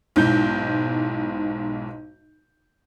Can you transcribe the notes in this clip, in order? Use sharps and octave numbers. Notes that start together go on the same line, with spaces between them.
B1 G#2 E4 G6